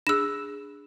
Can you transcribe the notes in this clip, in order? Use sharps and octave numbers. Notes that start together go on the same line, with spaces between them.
D4 G#4 E6 E7